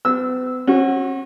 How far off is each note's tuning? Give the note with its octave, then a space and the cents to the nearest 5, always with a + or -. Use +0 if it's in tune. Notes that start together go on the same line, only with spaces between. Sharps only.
B3 +45 E6 -15
C#4 -40 F#4 +0